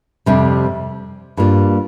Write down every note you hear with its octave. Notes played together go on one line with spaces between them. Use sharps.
F2 C3 G3
G2 G3 A#3 F4